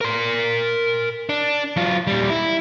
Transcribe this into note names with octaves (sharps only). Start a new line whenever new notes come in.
A#4 C6
D4
F#3 F4
A#2 G3
E4